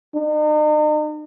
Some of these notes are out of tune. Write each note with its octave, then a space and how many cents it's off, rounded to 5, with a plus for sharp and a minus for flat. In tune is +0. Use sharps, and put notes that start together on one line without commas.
D#4 -40